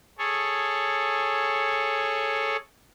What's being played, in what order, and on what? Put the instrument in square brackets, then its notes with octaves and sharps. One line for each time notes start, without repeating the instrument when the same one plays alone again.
[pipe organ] G#4 A4 C#5